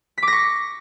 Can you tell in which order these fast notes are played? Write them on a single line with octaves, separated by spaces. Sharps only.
B6 D6 A#6 C#6